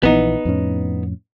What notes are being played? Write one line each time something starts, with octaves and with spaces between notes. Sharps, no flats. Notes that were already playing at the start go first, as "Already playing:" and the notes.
A#1 E3 B3 D#4
F2 A2 C#4